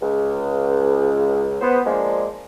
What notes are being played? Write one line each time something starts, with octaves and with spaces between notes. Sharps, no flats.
C#2
B3 C5
F3 G#3 A#3 D4